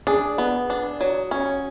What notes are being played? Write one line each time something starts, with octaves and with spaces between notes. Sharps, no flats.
D4 G#4
B3
D4
F#3
C#4